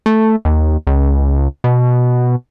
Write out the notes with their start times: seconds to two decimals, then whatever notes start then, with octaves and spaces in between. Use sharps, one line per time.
0.06 A3
0.45 D#2
0.87 C#2
1.64 B2